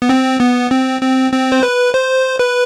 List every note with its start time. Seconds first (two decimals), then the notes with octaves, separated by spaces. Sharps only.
0.02 B3
0.09 C4
0.40 B3
0.71 C4
1.01 C4
1.32 C4
1.52 C5
1.63 B4
1.94 C5
2.39 B4